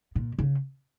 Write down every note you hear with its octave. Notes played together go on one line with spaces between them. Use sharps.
A#2
C#3